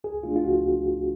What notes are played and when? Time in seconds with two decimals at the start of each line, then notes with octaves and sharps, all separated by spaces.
0.04 C#2 G#4
0.23 B2 A3 D4 F4
0.36 F4
0.44 C#2 F#4